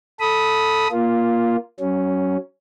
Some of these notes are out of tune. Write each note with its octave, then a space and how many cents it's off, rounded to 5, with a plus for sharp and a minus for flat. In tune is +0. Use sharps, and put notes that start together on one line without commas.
A4 +0 B5 -10 D#6 +15
A#3 +15 F4 +0
F#3 +25 C#4 +0